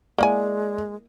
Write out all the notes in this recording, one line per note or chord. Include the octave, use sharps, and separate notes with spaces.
G#3 A#3 E4 D5 G#5